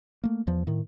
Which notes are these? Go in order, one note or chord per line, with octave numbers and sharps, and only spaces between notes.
A3 A#3
E2 F3
A2 D#3